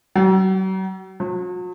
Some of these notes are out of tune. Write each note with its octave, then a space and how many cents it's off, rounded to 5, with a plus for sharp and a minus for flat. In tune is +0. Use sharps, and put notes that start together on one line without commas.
F#3 +40
F#3 -45